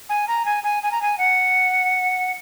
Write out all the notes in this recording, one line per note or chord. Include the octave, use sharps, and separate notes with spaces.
G#5
A#5
G#5
G#5
G#5
A#5
G#5
F#5